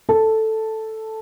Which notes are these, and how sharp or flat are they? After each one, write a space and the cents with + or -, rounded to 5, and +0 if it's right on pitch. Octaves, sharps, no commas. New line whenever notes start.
A4 +0 A5 +0